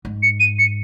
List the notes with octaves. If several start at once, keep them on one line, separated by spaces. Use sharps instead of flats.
G#2
C#7
D#7
C#7